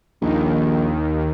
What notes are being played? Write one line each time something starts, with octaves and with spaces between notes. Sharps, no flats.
A#1 D#2 D#3